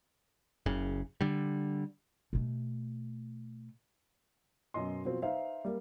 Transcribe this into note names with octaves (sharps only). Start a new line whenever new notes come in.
F#1 C#3
D3 G3
B2 A3
F#2 B2 D#5 C6
B2 F3 F#3 C4
D#4 B4 C5 E5 F5
G3 A#3